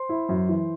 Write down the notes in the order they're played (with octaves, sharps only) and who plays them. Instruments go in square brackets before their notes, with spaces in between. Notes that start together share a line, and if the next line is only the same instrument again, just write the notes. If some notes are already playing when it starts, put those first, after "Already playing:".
Already playing: [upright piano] C5 C6
[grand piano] E4
F#2
E3